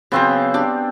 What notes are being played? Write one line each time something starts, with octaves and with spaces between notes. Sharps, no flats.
C#3 F#3 B3 C4 C5
D4 G4 D5